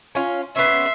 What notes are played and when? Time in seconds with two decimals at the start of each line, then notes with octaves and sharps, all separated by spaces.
0.15 C#4 F4
0.56 B3 C#4 E5 C6